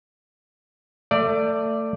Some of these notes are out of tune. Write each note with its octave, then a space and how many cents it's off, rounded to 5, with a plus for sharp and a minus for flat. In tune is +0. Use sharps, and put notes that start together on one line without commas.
A3 +25 D5 +0